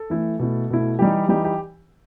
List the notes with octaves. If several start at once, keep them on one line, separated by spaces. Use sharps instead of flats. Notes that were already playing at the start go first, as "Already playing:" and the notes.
Already playing: A4
E3 A3 E4
B2 A3 E4
B2 A3 E4
E3 G3 D#4 G4
E3 G3 D#4 G4
G4